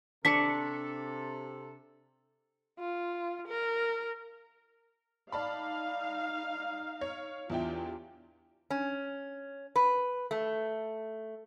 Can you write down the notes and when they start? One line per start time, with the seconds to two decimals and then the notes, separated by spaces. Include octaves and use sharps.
0.25 C3 D4 A4 C#6 B6 C#7
2.79 F4
3.48 A#4
5.32 D#4 D5 F5 A5 B5
7.01 C#5
7.50 E2 D4 E4 F4 G4 G5
8.70 C#4
9.76 B4
10.31 A3